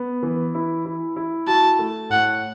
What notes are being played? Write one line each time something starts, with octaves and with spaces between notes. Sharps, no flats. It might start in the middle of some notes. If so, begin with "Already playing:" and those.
Already playing: B3
E3
E4
E4
E4
F#4 A5
A3
A2 F#5